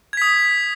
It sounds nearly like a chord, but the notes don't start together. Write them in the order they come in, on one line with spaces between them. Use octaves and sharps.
G#6 B6 D#6